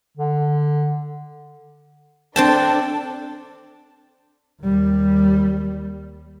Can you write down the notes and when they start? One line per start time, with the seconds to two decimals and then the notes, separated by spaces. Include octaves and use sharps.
0.17 D3
2.36 C4 D4 A4 G5 A5
4.62 D#2 G3